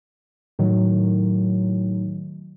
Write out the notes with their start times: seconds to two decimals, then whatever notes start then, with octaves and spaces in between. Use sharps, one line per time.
0.59 A2 D#3 F#3